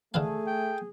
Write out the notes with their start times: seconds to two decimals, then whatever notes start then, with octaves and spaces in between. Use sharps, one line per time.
0.14 D3 E3 A3 G#4 F5
0.47 G5